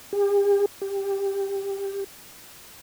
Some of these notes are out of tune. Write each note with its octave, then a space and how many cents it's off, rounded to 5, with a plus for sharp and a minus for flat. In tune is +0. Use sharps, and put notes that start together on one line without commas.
G4 +45
G4 +10